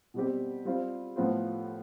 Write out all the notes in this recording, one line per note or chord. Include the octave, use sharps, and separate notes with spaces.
B2 G3 C4 G4
G3 C4 F4 C5
A2 F3 B3 F4 C5